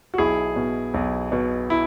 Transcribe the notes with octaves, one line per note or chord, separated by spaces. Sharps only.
F#4
B1 E4 G#4
B2
B1
B2
E4